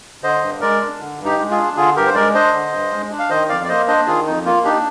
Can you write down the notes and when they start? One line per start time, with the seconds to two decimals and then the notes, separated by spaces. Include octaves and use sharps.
0.23 D3 C5 D#5
0.42 G2
0.61 G#3 A#4 D5
0.81 D4
1.00 D3
1.19 G2
1.25 D#4 G4
1.39 G#3
1.51 F4 G#4
1.57 D4
1.76 D3 F4 G#4
1.96 G2 G4 A#4
2.07 C5
2.15 G#3 A#4 D5
2.34 D4 C5 D#5
2.53 D3
2.73 G2
2.92 G#3
3.11 D4
3.19 F5
3.30 D#3 C5 D#5
3.49 F2 D5 F5
3.64 D5
3.68 A#3 C5 D#5
3.87 D4 C5 D#5
4.07 D#3 F4 G#4
4.26 F2 D#4
4.46 A#3 F4
4.64 D4 D#4 G4